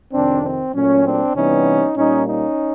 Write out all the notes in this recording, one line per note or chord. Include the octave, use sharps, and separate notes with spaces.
F2 C3 D#3 C4 D4
C4
A#2 F#3 A3 C#4
C4 D4
C3 E3 G3 B3 C#4 D#4
A#2 G3 A#3 C#4 D#4
C#4 D#4